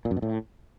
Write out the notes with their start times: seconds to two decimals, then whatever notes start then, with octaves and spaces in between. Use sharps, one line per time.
0.05 A#2
0.11 F#2
0.17 B2
0.22 A2